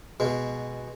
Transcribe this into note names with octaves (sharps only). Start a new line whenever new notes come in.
B2 G#3